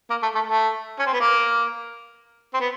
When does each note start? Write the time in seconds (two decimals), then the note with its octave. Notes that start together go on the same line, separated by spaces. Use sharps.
0.10 A#3
0.22 A3
0.35 A3
0.46 A3
0.99 C#4
1.06 C4
1.13 B3
1.20 A#3
2.54 C4
2.60 B3